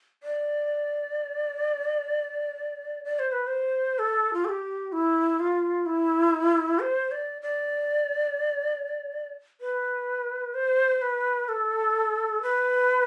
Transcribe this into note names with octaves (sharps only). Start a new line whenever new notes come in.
D5
D5
C5
B4
C5
A4
F4
A4
G4
E4
F4
E4
C5
D5
D5
B4
C5
B4
A4
B4